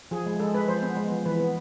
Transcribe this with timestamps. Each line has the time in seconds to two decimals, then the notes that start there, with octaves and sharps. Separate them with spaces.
0.11 F3 G#4
0.26 G#3
0.39 G#3 A4
0.54 G#3 B4
0.68 F3 C5
0.83 B3
0.97 G#3
1.11 F3
1.26 E3 B4
1.40 B3